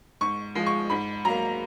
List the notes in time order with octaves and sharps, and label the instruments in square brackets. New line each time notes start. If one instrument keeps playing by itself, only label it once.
[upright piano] G#2 C#6
F3 G#3
C#6
G#2 B5
F#3 A#3 A#5